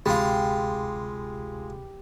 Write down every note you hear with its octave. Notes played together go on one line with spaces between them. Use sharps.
D2 C3 G#3 F4 G4 G#4 B5